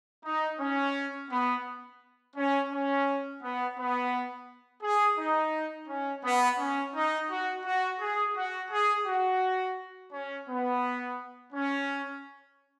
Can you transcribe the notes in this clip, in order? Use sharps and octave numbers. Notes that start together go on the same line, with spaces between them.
D#4
C#4
B3
C#4
C#4
B3
B3
G#4
D#4
C#4
B3
C#4
D#4
F#4
F#4
G#4
F#4
G#4
F#4
C#4
B3
C#4